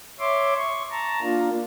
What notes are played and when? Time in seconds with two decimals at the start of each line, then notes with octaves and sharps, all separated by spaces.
0.20 C#5 E5 C6 D6
0.57 C#6
0.91 A5 A#5
1.22 A#3 D4 F4